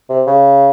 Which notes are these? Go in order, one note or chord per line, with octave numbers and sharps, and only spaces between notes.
C3
C#3